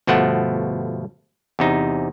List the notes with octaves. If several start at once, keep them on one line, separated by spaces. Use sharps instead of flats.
G1 B2 F3 A3 F#5
E2 C3 D#4